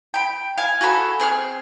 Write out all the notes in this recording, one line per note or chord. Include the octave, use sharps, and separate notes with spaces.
G5 B5
F5 G#5
F#4 G#4 A4 B5
C4 G#4 C#6 F6